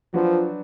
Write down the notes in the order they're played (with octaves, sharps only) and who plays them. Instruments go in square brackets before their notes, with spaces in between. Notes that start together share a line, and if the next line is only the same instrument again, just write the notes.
[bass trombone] F3 [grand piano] F#3 D4 F#4 B4